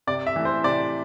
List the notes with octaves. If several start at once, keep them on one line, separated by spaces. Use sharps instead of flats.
C3 D5
E5
E3 A3
C5
C3 D5